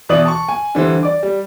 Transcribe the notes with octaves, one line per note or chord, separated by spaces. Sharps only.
B2 E3 D5 D#6 F#7
A5 C#6
G#5
D3 E3 G3 C5
D5 D6
G3